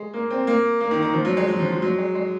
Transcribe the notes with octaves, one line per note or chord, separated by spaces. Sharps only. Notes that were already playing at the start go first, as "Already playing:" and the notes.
Already playing: G#3
A#3
C4
A#3
A#3
D#3
D#3
F3
F#3
G#3
F#3
F3
F3
F#3
G#3
G#3